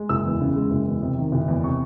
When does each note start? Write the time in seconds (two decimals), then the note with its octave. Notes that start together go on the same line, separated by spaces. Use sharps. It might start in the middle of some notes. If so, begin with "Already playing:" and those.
Already playing: G#3
0.09 F#1 E6
0.25 E2
0.41 C#3
0.56 G#3
0.71 F#1
0.87 E2
1.02 C3
1.18 D#3
1.32 F#1
1.48 E2
1.64 C3 C#6